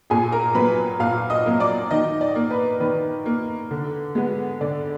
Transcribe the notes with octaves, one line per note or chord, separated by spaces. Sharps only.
A#2 G#4 G#5
A#4 A#5
F#3 A#3 B4 B5
A#2 F5 F6
D#5 D#6
F#3 A#3
D5 D6
D#3 D#4 D#5
D5
A#3
B4
D#3 B4
A#3
D3
G#3 B3
D3 D5